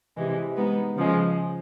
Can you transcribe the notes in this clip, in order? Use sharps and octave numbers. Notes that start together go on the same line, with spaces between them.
C3 E3 G#3
G#3 B3 D#4
C#3 F3 G#3